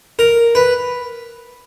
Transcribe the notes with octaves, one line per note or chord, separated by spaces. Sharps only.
A#4
B4